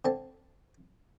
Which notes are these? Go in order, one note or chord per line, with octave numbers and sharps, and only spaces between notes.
D3 C4 A5